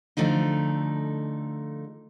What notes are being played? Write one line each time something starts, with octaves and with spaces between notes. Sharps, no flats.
D3 F3 A3 D#4